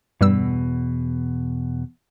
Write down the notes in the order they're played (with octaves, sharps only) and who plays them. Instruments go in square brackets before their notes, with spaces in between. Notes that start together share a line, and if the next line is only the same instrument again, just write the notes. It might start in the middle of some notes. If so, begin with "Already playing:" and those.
[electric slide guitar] E2 B2 [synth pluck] G2 G3 E6